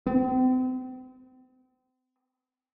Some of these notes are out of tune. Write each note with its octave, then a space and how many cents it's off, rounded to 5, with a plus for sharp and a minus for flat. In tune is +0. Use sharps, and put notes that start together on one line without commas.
C4 -35